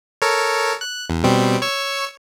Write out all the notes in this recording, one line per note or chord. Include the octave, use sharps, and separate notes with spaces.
A4 A#4 C#5
F#6
E2
B2 G3 C4
C#5 C#6 E6